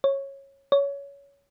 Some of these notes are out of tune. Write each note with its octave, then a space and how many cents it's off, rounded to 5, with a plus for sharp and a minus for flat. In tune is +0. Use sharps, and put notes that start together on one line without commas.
C#5 -15
C#5 +20